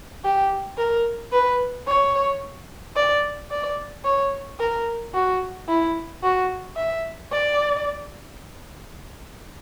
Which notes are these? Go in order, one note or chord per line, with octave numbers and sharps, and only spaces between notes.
G4
A#4
B4
C#5
D5
D5
C#5
A#4
F#4
E4
F#4
E5
D5